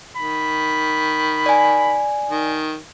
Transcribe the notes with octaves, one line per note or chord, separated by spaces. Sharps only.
D#3 B5
D5 G#5
D#3